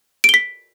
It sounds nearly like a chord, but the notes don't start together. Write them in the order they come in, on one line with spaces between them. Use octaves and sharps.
D7 G7 B6